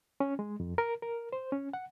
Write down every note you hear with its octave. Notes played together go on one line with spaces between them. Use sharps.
C#4
G#3
F2
A#4
A#4
C5
C#4
F#5